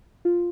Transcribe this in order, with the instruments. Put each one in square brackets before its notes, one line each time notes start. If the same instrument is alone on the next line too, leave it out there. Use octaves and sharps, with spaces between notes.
[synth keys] F4